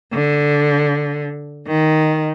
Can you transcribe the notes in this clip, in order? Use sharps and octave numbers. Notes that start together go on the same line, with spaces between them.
D3
D#3